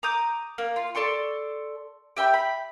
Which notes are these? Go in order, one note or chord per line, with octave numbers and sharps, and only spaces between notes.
A#5 D6 D#6 G6
A#3
F4
A4 D5 C6 C#6
G4 E5 G5 B5
B5